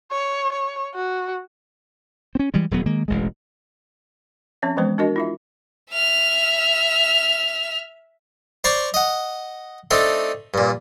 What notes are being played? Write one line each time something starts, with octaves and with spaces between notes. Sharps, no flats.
C#5
C#5
F#4
C4 C#4
E3 G3 G#3
D#1 F#3 B3
D#3 G#3 A#3
E1 A1 G#3
F3 C4 C#4 C#5 E5
E3 F3 G#3 B3 C5
D4 F#4 A#4 D#5
E4 F4 E5
E5 F6
C5 D5 A#5 C6 C#6
D#5 F#5
A3 C4 D4 D#4 A4
G2 A#2